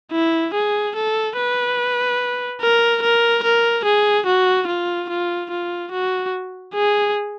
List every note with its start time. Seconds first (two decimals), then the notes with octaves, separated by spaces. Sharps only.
0.12 E4
0.54 G#4
0.96 A4
1.37 B4
2.61 A#4
3.03 A#4
3.44 A#4
3.85 G#4
4.26 F#4
4.68 F4
5.10 F4
5.51 F4
5.92 F#4
6.75 G#4